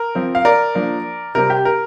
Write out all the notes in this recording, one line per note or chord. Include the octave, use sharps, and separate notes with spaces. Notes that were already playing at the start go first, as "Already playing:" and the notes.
Already playing: A#4
F3 C4
F5
A#4 D5
F3 A#3 D4
C3 G3 C4 A#4
G4
A#4